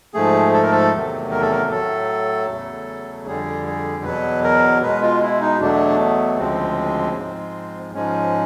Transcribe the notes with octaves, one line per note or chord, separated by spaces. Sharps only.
G#2 F3 A3 G#4
A4
A#4
A4
E2 C3 D#3 F#3 A3
A#4
A4
A#4
A2 F#3 A3 A4
E2 C#3 F#3 A3
F2 D3 G3 G#4
G#4
E2 B2 F#3 B4
A#4
B2 G#3 B4
F4
E4
D#4
E2 B2 F#3 A3 D4
B3
D2 C#3 F3 G#3 C4
G#2 F3 G#3
G#2 F3 G#3 C#4